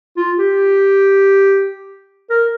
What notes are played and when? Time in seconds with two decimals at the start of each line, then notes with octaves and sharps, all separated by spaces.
0.17 F4
0.38 G4
2.30 A#4